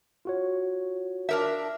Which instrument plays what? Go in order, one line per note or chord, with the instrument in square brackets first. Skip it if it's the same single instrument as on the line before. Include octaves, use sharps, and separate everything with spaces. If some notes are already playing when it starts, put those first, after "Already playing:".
[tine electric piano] F4 F#4 C#5
[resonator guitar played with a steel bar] D4 A#4 E5